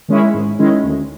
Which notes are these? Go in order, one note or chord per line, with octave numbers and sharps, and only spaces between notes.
D#3 G#3 C#4 E4
G#2
D#3 G#3 C#4 E4
D2